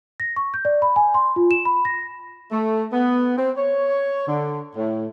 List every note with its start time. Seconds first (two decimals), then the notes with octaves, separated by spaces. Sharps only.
0.20 A#6
0.36 C#6
0.54 G6
0.65 D5
0.82 B5
0.96 G#5
1.14 C6
1.36 F4
1.51 E7
1.65 B5
1.85 A#6
2.52 A3
2.93 B3
3.38 C4
3.57 C#5
4.28 D3
4.76 A2